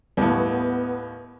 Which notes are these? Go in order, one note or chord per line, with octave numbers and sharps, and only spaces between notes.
D#2 A2 B3